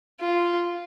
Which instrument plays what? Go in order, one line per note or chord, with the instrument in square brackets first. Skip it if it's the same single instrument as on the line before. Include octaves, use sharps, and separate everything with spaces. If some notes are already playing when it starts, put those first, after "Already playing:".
[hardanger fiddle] F4